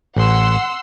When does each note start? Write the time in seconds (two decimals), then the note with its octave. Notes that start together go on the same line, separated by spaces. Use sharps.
0.16 A1 F#5 C6 E6